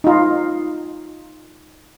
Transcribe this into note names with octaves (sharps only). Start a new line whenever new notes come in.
D#4 F4